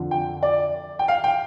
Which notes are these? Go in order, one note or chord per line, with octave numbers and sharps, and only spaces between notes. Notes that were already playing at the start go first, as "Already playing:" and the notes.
Already playing: F2 D3 F3
G5
D5
G5
F5
G5